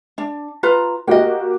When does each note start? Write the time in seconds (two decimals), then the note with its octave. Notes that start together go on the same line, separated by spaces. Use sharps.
0.18 D4
0.63 F4 B4 A#5
1.07 A#3 F#4 G4 D#5 G5